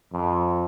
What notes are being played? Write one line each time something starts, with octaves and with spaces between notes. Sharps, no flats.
F2